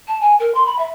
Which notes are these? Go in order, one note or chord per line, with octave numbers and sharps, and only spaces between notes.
A5
G#5
A#4
C6
B5
E5